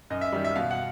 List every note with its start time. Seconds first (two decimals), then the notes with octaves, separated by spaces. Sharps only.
0.10 F#2 D#5
0.21 E5
0.32 D#3 G3
0.44 E5
0.56 B2 F5
0.71 F#5